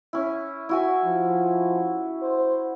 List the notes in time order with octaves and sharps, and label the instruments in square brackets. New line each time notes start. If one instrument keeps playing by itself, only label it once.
[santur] C#4 E4
E4 F#4 G#5
[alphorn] F3
C5